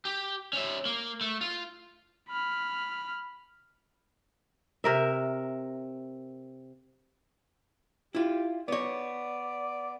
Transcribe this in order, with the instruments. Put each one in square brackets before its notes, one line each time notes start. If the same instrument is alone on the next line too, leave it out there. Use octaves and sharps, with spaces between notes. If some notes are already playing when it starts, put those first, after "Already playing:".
[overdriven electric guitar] G4
C#4 E5
A#3
A3
F4
[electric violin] B5 F6
[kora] C3 A#4 E5
[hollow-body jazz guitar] E4 F4 [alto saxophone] G4
[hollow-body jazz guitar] B3 C#5 [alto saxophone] D5